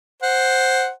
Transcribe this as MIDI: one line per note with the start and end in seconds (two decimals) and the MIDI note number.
0.23 0.89 72
0.23 0.89 78